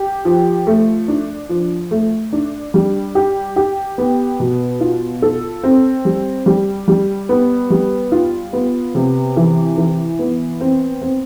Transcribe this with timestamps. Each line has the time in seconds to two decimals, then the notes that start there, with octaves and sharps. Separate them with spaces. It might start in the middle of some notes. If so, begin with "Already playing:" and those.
Already playing: G4
0.25 F3
0.67 A3
1.08 D4
1.49 F3
1.91 A3
2.33 D4
2.74 G3
3.15 G4
3.56 G4
3.98 B3
4.40 B2
4.81 F4
5.22 A4
5.63 C4
6.05 G3
6.46 G3
6.88 G3
7.29 B3
7.70 G3
8.12 F4
8.53 B3
8.95 C3
9.36 E3
9.77 E3
10.19 B3
10.61 C4
11.01 C4